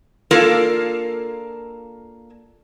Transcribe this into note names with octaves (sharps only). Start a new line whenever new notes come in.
A#3 D4 F4 A4 A#4